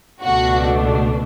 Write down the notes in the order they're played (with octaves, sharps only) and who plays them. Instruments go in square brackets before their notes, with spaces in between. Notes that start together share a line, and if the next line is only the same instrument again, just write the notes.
[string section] C#2 B2 A3 D4 F#4